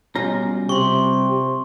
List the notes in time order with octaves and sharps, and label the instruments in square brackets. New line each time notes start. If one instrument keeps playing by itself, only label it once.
[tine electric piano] B2 C#4 [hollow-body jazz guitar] G3 F4 A#5
[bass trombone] C3 [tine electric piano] G4 [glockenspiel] C6 C#6